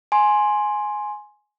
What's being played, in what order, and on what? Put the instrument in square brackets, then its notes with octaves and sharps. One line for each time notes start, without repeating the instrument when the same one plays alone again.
[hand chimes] G#5 C6